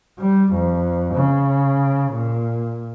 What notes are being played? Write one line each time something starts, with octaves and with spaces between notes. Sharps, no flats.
G3
F2
C#3
A#2